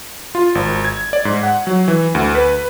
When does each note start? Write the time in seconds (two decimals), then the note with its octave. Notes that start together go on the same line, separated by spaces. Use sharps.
0.35 F4
0.55 G#1
0.85 G#6
1.13 D5
1.25 G#2
1.43 F#5
1.67 F#3
1.88 E3
2.15 D2
2.35 B4